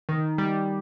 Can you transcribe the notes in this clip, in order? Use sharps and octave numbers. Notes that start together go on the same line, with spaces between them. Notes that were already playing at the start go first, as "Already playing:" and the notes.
D#3
G3